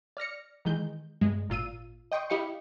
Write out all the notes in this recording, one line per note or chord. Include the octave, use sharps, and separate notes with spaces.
D5 F6 A#6 C#7
D#3 E3 G#3 G6
G2 G#3
G#1 A#2 F4 E6 D#7
D#5 G5 C6 C#6 D#6
E4 G4 D#5 F5 G5 C#7